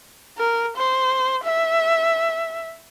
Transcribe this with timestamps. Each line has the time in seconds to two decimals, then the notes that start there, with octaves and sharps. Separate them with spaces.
0.38 A#4
0.76 C5
1.44 E5